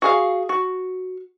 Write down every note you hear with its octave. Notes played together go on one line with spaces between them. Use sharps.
F#4 G#4 F5
F#4